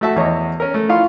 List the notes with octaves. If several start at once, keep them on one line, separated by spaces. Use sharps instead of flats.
A3 F#4 E5 A5
E2 C#5 D#5
C#4 A#4
A3
E4 F4 F5 C6 C#6